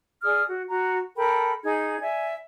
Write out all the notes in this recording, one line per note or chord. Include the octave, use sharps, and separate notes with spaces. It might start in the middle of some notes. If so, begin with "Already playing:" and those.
G#4 D5 D#6 F6
F#4
F#4 A#5
A4 A#4 G5 B5
D#4 G#4 G#6
D5 E5 G#5